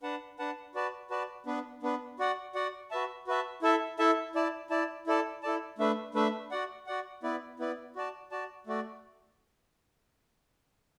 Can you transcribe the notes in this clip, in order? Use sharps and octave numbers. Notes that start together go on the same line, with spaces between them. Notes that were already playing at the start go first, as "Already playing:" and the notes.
D4 B4 F#5 A5
D4 B4 F#5 A5
F#4 B4 D5 A5
F#4 B4 D5 A5
B3 D4 B4
B3 D4 B4
F#4 D5 F#5
F#4 D5 F#5
F#4 B4 E5 A5
F#4 B4 E5 A5
E4 A4 E5 A5
E4 A4 E5 A5
E4 D5 A5
E4 D5 A5
E4 A4 D5 A5
E4 A4 D5 A5
A3 D4 B4 E5
A3 D4 B4 E5
F#4 D5 F#5
F#4 D5 F#5
B3 E4 B4 D5
B3 E4 B4 D5
F#4 D5 A5
F#4 D5 A5
A3 F#4 D5